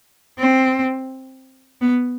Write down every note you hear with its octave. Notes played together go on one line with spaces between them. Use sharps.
C4
B3